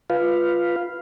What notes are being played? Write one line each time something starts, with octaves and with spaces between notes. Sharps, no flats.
F4 B4 F5